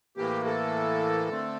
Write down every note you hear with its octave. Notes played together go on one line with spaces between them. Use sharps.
A2 E3 A#3 G4
A4
D3 A3 C4